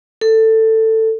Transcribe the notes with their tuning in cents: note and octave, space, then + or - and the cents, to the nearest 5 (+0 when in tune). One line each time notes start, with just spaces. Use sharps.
A4 +15